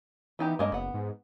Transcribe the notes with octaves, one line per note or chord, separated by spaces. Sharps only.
E3 B3 D#4 G4
G2 G#3 A#3 D#5
F#1 B3 F#5
G#2